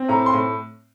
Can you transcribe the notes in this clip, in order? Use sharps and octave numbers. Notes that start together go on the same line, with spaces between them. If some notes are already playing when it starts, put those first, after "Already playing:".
Already playing: C4
A2 A#5
C6
A2